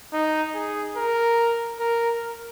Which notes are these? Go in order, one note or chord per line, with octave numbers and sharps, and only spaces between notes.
D#4
G#4
A#4
A#4